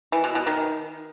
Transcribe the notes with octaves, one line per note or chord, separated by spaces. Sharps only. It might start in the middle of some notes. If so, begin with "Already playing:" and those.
E3
B2
B2
D#3